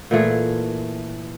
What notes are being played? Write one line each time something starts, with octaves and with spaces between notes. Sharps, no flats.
A#2 E3 A3 G#4